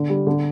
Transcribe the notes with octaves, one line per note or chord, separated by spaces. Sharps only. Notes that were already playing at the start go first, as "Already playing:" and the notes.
Already playing: D3
G3
D3